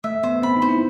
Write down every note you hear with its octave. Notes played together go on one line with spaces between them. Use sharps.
A3 E5
B3 C5
C4 B5
D#4
C5
E4